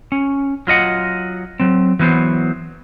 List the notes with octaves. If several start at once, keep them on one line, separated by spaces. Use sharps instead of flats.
C#4
F#3 F4 D#5 F#5
F#3 C4
E3 F#3 B3 C5